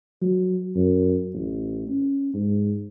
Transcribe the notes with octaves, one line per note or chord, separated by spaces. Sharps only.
F#3
F#2
A1
C#4
G#2